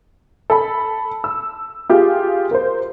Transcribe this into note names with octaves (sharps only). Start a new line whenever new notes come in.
A4 B5
E6
F4 G4 G#4
A#4 C5